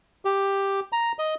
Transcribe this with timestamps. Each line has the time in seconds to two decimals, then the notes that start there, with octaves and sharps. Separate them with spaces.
0.25 G4
0.93 A#5
1.19 D#5